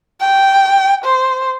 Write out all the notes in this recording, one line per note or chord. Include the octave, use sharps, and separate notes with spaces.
G5
C5